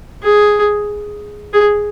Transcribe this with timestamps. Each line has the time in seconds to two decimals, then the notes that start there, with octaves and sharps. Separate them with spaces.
0.23 G#4
1.53 G#4